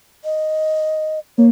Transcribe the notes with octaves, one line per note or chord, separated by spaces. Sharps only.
D#5
A#3 C#5